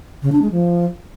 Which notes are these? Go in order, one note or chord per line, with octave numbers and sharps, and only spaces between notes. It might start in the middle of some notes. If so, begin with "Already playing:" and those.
C#3
D4
G#3
F3